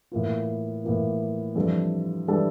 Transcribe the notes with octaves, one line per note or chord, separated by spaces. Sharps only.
A2 E3 A#3 F4
A2 E3 A#3 F4
F2 E3 G3 D4 A4
E3 G3 D4 A4